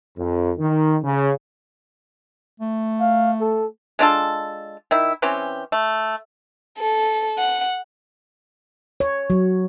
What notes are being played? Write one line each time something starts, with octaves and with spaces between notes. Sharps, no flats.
F2
D#3
C#3
A3
F5
A4
G#3 D4 F4 A4
D#3 E4
E3 C4 C#4 G4
A3
A4
F#5
C#5
F#3